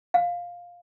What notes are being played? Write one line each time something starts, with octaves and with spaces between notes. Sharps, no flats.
F5